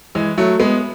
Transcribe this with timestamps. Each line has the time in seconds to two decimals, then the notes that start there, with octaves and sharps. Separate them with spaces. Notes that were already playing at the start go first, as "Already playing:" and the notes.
0.15 E3 G#3
0.38 F#3 A3
0.60 G#3 B3